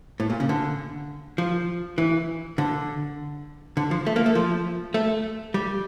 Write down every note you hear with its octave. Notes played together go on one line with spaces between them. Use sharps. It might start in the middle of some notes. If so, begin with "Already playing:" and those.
A2
A#2
C#3
D3
F3
E3
D3
D3
F3
A3
A#3
A3
F3
A3
G3